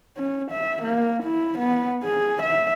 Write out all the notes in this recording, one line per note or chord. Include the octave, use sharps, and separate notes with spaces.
C#4
E5
A#3
E4
B3
G#4
E5